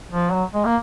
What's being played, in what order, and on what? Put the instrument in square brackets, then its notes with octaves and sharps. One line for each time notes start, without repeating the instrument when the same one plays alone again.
[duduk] F3
F#3
G#3
A#3